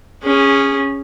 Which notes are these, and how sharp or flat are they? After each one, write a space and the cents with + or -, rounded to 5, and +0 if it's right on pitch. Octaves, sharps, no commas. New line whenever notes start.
C#4 +0 G#4 -20